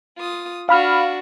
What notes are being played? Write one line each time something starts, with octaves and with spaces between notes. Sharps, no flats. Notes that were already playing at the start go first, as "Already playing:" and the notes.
F4 D#6
D4 F#4 F5 B5 F6